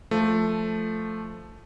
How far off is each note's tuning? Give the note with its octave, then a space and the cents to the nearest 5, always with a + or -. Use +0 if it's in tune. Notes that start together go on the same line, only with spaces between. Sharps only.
F3 +0 A3 +0